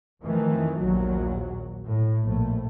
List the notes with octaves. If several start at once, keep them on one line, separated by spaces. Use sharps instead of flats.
F2 D#3 E3 A3
A#1 D#2 F#3
A2
A#1 A3